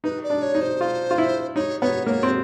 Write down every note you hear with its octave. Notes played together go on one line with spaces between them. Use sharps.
D#4 B4
D5
D4
C#5
D#4
C5
F4
F4
E4
D#4 C#5
B3 C#5
A#3 C#5
C4